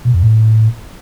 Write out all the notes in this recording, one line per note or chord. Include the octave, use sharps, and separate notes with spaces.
B2
F2
A2